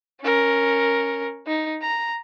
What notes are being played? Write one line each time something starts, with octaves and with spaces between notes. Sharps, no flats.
C#4 A#4
D#4
A#5